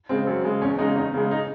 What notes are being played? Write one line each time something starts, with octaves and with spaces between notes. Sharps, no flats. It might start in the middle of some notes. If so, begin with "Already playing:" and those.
C#3 G#3 C4
F#2
C#3 G#3
E2 C#4
C#3 G#3 D#4
E2 D#4
C#3 G#3
D#4